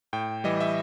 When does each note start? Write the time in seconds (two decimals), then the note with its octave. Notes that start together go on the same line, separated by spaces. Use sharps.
0.13 A2 G5
0.44 E3 G3 D#5
0.60 E5